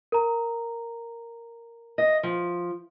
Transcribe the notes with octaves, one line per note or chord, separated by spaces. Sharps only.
A#4 A#5
D#5
F3